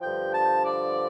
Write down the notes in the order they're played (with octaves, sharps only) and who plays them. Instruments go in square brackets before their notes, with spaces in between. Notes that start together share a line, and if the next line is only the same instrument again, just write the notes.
[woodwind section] G2 D3 F3 [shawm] G5
[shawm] A5
D5